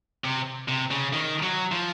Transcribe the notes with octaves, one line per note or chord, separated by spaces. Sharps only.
C3
C3
C#3
D#3
F#3
F3